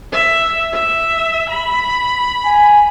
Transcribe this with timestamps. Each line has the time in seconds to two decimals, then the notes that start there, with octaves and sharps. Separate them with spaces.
0.12 E5
0.73 E5
1.50 B5
2.46 G#5